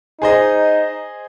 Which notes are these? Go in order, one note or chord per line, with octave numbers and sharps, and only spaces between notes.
D#4 G#4 C5 D#5